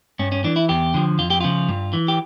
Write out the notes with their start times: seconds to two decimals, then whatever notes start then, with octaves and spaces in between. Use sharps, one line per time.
0.19 G2 C#4
0.32 C#4
0.44 E3 D4
0.56 E4
0.69 E2 G4
0.94 D3 F3
1.19 F2 F4
1.30 G4
1.40 C#3 F3 F4
1.69 G2
1.93 E3
2.08 G4